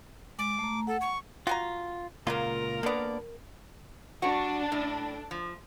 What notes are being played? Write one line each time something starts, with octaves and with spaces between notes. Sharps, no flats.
G#3 D6
A3 A#5
A4 F#5
C#6
F4 F#4 G#5 A#5
C#2 A#2 C#3 F#3 A#3 F4 A#4
D3 A#3 B3 D5
G3 D4 F#4
A2
F3